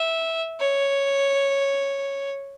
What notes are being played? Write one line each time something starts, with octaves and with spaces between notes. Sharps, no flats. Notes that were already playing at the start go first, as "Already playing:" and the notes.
Already playing: E5
C#5